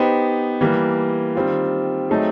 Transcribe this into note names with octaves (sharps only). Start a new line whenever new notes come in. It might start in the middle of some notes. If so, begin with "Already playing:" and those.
Already playing: B3 D#4 G4 C5
E3 G3 A#3
D#3 G3 C4 F4
F#3 A3 C4 D#4 G#4